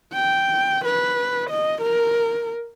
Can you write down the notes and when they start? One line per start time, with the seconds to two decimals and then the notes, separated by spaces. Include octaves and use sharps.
0.14 G5
0.85 B4
1.50 D#5
1.82 A#4